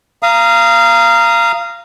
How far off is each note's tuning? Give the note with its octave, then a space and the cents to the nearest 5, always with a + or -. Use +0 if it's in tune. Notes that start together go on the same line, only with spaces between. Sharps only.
F5 -20 A#5 +0 D#6 +0